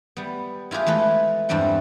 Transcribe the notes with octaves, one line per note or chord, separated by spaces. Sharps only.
G3 B3
E4 F4 G4 G#4 B4
E3 G#3 A3 B4
E2 G2 G3 C4 F#5